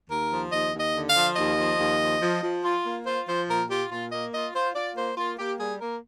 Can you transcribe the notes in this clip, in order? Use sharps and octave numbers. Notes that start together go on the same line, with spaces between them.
D#2 A#4
F3
D#2 D#5
D#2
D#5
D3
F5
F3
D#2 D#5
F3
D#2
F3
F3
F3
F4
A#3
F4 C5
F3 C5
A#2 A#4
F4 G4
A#2 F4
A#3 D#5
F4 D#5
F4 C5
F4 D5
A#3 C5
A#3 F4
A#3 G4
G3 G#4
A#3 A#4